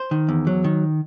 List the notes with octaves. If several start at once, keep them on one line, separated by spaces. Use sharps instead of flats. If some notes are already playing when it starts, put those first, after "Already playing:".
Already playing: C5
D#3
E2
F#3
D#3